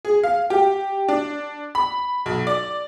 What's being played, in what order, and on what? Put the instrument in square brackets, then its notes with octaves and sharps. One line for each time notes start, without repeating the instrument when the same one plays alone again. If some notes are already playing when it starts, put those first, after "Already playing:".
[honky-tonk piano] G#4
F5
G4
D4
B5
B1
D5